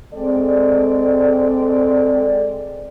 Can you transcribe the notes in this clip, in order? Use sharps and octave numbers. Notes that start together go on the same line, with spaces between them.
G#3 C4 A4 D5